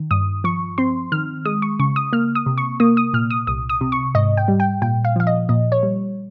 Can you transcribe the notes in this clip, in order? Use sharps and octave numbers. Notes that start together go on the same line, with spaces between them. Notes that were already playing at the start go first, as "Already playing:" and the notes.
Already playing: D#3
G2 D#6
F3 C#6
C4 C6
D#3 F6
G#3 D#6
C#6
C#3 C#6
D#6
A#3 F6
D#6
C3
C#6
A#3 D#6
D#6
A#2 F6
D#6
C2 D#6
D#6
C3
C#6
G#2 D#5
G5
G3
G5
A#2 G5
F5
F3 F5
D#5
A#2 D#5
C#5
G3